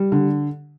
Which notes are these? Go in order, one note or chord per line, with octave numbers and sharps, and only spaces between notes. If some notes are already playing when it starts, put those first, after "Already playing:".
Already playing: G3
D3